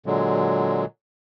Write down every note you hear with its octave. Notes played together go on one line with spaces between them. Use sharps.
A#2 D3 F#3 G#3